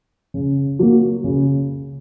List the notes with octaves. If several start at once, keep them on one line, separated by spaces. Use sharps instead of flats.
C#3
F#3 A#3
C#3